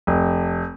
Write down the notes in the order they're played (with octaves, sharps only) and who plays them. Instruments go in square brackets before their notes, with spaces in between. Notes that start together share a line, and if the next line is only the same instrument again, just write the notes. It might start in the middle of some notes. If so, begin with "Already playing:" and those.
[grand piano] F1